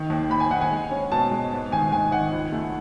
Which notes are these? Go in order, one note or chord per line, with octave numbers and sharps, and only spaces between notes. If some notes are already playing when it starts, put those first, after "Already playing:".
Already playing: D#3
D#2
D#2 B5
G#5
D#3 F#5
G#5
G#3
C#4
B2 A5
G#3
G#2
D#3 G#5
D#3 G#5
D#3 F#5
C#2
A3